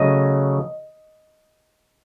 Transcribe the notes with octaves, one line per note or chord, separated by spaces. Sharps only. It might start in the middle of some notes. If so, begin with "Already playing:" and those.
Already playing: C#3 F#3 A3 D#5